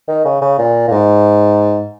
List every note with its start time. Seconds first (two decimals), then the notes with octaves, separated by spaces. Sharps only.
0.08 D#3
0.25 C#3
0.41 C#3
0.58 A#2
0.88 A#2
0.92 G#2